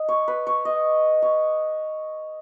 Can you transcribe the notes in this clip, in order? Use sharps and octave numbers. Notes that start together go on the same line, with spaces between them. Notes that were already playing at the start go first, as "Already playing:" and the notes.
Already playing: D#5
C#5
B4
C#5
D#5
C#5